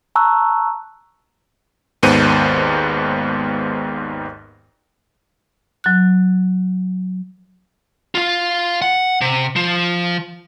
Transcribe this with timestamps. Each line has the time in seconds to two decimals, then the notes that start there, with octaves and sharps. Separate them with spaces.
0.16 A5 A#5 C#6 E6 F#6
2.03 G#1 D#2 G#2 B3 C5 D#7
5.84 F#3 F#6
8.15 F4 F5
8.82 F#5
9.21 C3
9.56 F3